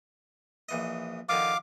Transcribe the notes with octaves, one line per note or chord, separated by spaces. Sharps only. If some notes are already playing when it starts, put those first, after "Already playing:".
A#1 E3 D#5
D3 D#3 F3 F5 D6